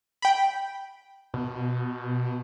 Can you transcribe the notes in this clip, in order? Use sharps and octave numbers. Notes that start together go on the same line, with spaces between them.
G5 B5
B2